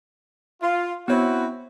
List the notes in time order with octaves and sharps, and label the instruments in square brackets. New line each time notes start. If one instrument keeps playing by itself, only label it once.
[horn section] F4
[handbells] B3 C#5 [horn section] C4 E4 F#4